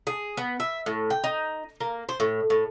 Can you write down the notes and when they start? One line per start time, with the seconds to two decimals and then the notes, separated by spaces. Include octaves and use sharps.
0.07 G#4
0.37 B3
0.60 E5
0.86 A2
1.10 G5
1.24 D#4
1.80 A#3
2.09 C5
2.20 A2
2.50 A2